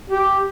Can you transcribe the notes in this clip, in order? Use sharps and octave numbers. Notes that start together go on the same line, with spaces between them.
G4